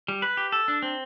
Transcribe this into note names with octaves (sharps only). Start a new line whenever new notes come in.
G3
B4
G4
A4
D4
C4